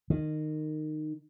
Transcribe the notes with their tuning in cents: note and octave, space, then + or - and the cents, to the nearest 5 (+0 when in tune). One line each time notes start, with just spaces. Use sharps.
D#3 -20